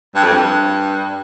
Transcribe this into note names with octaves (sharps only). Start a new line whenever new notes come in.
G2
F2
G2